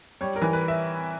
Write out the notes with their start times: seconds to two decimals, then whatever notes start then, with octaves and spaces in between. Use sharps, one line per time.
0.21 G3 C#5
0.36 A#4
0.42 E3
0.53 B4
0.68 E5